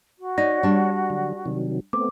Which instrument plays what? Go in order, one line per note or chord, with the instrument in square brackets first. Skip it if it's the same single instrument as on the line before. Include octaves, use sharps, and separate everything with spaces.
[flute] F#4
[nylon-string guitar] D#4 [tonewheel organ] C#5 [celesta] D5 A#6
[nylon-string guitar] G3 D4
[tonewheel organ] D3 F#3
C3 D#3 F#3
[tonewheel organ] A3 B3 C4 [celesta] D6